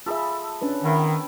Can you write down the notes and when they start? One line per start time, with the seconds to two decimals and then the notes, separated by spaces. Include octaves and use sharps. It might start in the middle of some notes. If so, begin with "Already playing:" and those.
0.06 F4 G#4 A4 E5 B5 D#6
0.62 C#4 D4 B4
0.84 D#3 B3 E4 G5